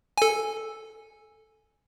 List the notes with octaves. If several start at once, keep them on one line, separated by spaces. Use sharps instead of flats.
A4 G#5